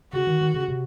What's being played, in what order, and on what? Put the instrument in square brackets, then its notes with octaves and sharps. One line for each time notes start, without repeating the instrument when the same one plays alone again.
[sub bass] C#3 [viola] F#4
[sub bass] D#3
D#3
C#3
C3